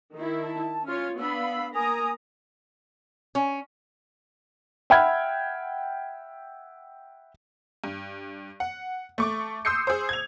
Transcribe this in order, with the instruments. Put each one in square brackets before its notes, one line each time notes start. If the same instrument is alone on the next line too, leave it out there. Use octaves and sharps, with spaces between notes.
[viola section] D#3 E4
[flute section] A5
[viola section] C#4 F4 C#5 [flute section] F6
[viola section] B3 D4 B5 [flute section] F5 E6
[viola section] A#3 A#4 A#5 [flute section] G#5 D#6
[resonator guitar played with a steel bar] C#4
[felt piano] E5 F#5 G5 B5 F6 G#6
[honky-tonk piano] G2
F#5
A3 C#6 D6
C6 D#6 E6 G6 C7 C#7
G#4 C5
G#6 F7